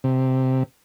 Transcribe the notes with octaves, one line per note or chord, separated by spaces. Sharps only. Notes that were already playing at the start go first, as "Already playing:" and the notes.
C3